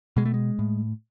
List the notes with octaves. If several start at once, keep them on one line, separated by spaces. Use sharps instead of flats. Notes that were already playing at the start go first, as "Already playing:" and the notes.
B2 G#3
A3
G#3
A2